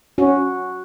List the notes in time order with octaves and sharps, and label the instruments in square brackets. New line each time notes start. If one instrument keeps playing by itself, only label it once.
[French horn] C#4 [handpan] F#4